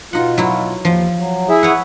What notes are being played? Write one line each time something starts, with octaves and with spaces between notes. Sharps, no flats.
B2 D#4 F4 F#5
F#3 E4
D#2 F3
F#3
E4 G#4 E5
B4 C#5 F#5